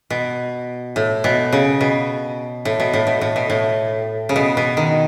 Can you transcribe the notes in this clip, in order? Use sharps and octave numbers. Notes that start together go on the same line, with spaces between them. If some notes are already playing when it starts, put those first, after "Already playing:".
B2
A2
B2
C#3
B2
A2
B2
A2
B2
A2
B2
A2
C#3
B2
B2
D#3